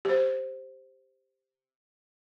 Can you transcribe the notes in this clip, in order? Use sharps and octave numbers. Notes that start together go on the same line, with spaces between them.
G4 C5